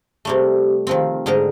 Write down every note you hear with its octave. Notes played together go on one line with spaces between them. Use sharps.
C3 G3 A3
D#3 F3 C4
G#2 D3 D#4 A#4 A#5